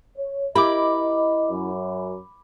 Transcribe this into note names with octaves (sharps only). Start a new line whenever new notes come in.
C#5
E4 G4 A#4 D#5 B5 D6
F#2